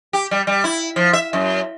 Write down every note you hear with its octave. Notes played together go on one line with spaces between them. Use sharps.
G4
G3
G3
E4
F3
E5
F#2